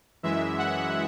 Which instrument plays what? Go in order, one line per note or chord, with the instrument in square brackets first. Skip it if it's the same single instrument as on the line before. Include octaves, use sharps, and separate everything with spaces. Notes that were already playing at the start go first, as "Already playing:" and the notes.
[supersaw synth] F#2 E3 G#3 E5
F#5